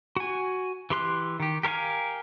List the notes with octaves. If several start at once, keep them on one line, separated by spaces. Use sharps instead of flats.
F#4 G#5
E3 G4 C6 F#6
D#3 G4
G4 A#4 C#5 F5 G#5